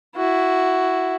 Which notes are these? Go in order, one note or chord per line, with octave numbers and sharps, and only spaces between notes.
E4 F#4